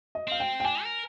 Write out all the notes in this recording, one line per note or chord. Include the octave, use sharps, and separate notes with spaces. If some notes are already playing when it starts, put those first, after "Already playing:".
D#5
C4 F5
G5
G5
D4 G#5
A#4